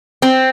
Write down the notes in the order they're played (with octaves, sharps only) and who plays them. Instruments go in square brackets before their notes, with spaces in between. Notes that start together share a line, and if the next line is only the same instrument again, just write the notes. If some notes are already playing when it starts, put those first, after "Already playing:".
[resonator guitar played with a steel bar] C4